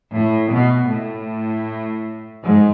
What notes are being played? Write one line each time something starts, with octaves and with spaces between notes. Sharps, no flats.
A2
B2
A2
G#2